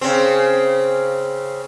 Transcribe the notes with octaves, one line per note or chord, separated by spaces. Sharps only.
C#3 C4